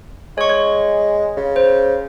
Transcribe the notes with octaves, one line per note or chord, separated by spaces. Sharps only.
G#3 C#5 C#6
C#5
C#3
C5